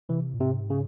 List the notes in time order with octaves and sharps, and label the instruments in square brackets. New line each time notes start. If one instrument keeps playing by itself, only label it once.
[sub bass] C3 [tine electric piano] E3
[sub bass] A#2
[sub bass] G#2 [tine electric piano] C3
[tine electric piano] C#3